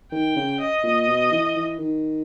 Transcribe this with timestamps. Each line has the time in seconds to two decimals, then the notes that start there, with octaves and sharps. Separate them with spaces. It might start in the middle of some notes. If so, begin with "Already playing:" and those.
0.12 D#3 G5
0.36 C#3
0.60 D#5
0.83 A#2
1.07 B2
1.32 E3
1.56 E3
1.79 D#3